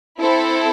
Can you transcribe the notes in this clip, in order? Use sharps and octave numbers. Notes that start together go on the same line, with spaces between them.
C4 E4 A4